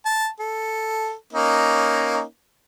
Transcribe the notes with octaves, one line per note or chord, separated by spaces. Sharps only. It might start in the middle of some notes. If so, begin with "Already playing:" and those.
A5
A4
A#3 C#4 D#4